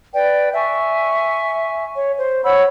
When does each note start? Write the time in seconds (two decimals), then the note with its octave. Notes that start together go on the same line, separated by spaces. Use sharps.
0.14 B4 D5 G5
0.54 E5 G#5 C#6
1.95 C#5
2.20 C5
2.44 C#5 F#5 B5 E6